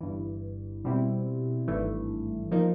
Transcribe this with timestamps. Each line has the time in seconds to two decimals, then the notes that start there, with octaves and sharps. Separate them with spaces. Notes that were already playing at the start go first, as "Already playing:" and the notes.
0.01 G1 G2 E3
0.84 B2 G3 C4 E4
1.68 G#1 G2 E3 A3
2.51 F3 A#3 D#4